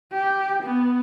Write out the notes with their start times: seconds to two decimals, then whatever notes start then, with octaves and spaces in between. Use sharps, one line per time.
0.12 G4
0.63 B3